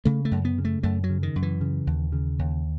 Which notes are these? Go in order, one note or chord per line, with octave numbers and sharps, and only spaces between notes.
C#3 A3
A3
F#2
B3
C#3
A3
F#2 A3
F#3
C#3
D#3
F#2
E3
C#3
D#2
C#3
D#2